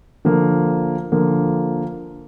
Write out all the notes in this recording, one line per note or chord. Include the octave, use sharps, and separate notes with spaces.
D3 F3 A#3
D3 F3 A#3